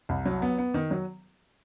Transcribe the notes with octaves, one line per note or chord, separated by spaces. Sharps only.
C2
F#3
B3
B3
D#3
F#3